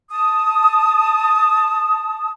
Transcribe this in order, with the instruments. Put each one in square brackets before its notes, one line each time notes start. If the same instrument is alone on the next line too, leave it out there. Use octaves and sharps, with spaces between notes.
[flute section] A5 D#6